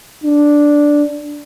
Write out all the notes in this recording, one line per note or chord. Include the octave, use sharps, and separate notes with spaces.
D4